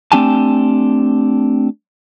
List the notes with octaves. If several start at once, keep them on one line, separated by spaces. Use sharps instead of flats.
A3 C4 D4 G4 G#5 A5